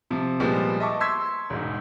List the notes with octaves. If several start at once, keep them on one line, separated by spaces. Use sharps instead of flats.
C3 F3
A#2 F3 G3 G#3 B3
D#5 E5 A5 C#6 D6
C6 C#6 E6 G#6 B6
E1 G#2